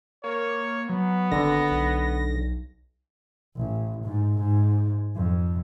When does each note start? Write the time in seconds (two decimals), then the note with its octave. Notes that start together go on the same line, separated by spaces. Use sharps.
0.24 A#3 C#5
0.89 F#3 B3
1.32 G#1 D3 A#6
1.71 B1
3.56 A1
4.04 G#2
4.39 G#2
5.16 F2